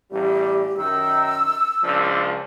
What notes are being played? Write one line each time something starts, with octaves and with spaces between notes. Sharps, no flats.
A1 G3 G4
F#2 D#3 E6
C#2 F3 D4